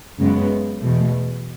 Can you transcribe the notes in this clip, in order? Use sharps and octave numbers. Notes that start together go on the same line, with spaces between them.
F#2 C#3 G#3 B3
E2 B2 A3